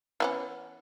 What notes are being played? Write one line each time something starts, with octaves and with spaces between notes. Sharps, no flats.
E3 B3 C#4